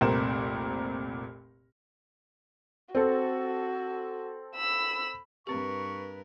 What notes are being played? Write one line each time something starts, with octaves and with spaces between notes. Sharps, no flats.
F1 C2 A#2 C4 A#4 E7
C4 F#4 A4
B5 E6
G2 C4 G4 A#4 B4 C#6